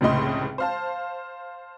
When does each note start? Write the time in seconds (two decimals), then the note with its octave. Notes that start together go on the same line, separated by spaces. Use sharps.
0.01 F1 C#2 A2 D#5 C6
0.58 C5 F5 A5